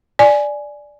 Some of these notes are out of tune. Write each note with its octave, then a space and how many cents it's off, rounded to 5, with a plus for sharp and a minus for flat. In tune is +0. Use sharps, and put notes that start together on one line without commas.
D5 +0 G#5 +5